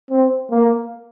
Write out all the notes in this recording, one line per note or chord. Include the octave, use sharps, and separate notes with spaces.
C4
A#3